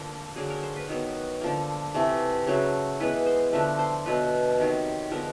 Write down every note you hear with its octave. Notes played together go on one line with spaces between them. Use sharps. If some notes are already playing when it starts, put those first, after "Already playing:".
Already playing: D3 F3 A#3
D3 F#3 A#3 G#4
A#4
C5
B4
D#3 F#3 B3
D3 F3 A#3
C3 E3 A3
C#3 F#3 A3
E3 G#3 B3 B4
C5
D3 F3 A3 B4
C5
B2 F#3 A3 B4
C3 D#3 F#3
D3 F3 G#3 B3 A#4